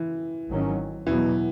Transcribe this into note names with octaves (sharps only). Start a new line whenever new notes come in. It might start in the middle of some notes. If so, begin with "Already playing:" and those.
Already playing: E3
G#1 G#2 D#3 F#3 C#4
E2 B2 E3 F#3 B3